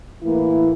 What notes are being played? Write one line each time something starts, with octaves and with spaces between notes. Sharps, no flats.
A2 E3 A#3 E4